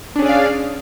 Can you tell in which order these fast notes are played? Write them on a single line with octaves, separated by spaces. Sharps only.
D4 C#4 G#4 D5 F5